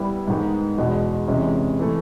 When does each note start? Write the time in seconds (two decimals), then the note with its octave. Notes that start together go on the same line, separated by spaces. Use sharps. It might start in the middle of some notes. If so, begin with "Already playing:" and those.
Already playing: G3 B3 E4
0.28 G#2 D#3 G#3 B3
0.78 E2 B2 G#3
1.28 C3 E3 G#3 C#4
1.79 E3 A3